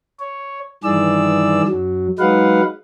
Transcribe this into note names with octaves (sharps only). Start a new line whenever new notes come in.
C#5
G2 D#3 E3 G#4 D5 E6
F#2 F#3
F#3 G#3 D#4 B4 F5 F#5